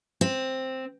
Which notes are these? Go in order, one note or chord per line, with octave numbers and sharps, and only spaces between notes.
C4